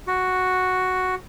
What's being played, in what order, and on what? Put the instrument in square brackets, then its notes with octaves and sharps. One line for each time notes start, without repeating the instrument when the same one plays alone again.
[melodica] F#4